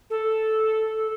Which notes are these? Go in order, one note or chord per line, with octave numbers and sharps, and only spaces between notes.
A4